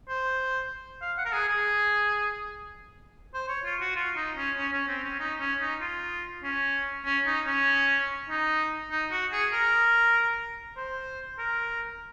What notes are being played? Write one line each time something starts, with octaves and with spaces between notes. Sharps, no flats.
C5
F5
F#5
A#4
G#4
G#4
C5
C#5
F4
F#4
F4
D#4
C#4
C#4
C#4
C4
C#4
D#4
C#4
D#4
F4
C#4
C#4
D#4
C#4
D#4
D#4
F#4
G#4
A#4
C5
A#4